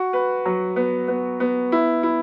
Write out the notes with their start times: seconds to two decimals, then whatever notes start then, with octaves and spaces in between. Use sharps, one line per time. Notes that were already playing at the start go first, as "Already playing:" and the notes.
Already playing: F#4
0.13 B4
0.45 F#3
0.76 B3
1.08 B3
1.40 B3
1.72 E4
2.03 E4